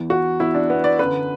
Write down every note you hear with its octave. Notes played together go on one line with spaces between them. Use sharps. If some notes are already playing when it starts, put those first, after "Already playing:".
Already playing: E2 E3
F#4
E2 E3 E4
D4
B3
D5
F#2 D3 B4